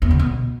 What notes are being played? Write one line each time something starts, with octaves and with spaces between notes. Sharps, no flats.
E2
C#3
B2